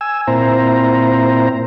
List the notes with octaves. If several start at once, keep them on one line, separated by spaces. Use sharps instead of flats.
G#5 E6
A#2 C4 E4 C5 A#5